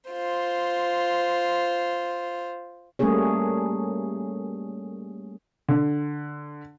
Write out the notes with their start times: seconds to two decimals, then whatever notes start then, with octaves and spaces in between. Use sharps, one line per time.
0.10 F4 C5
2.99 G3 A3 A#3 C#4 G#4 C#5
5.69 D3